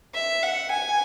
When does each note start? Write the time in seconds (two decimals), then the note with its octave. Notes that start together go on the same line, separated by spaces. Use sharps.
0.14 E5
0.43 F#5
0.71 G#5